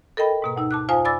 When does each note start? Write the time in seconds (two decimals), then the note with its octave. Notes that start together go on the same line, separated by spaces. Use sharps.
0.17 A4 A#4 D#5 G5 B5
0.42 G#2 B2 A#3
0.57 D2 D#4 E6
0.71 A5 D6 F#6
0.89 F2 F4 C5 F5 G#5 D#6
1.05 D5 G#5 B5 D6 E6 A6